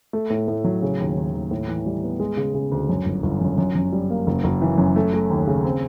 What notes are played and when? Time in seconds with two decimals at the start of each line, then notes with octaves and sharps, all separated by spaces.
0.13 A3
0.30 A2
0.48 A2
0.64 F#3
0.82 C#3
1.00 D#2
1.17 D#2
1.34 D#2
1.51 A2
1.68 E3
1.86 G3
2.03 B3
2.20 G#3
2.37 C#3
2.54 C#3
2.72 D2
2.89 F#2
3.06 G1
3.23 G1
3.41 F#2
3.58 F#2
3.75 F#2
3.92 G3
4.10 A#3
4.27 F#1
4.44 F#1
4.62 E3
4.78 F#2
4.96 A3
5.13 A3
5.30 D#2
5.47 C#3
5.64 C4